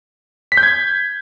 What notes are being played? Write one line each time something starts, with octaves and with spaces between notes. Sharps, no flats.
B6
G6
G#6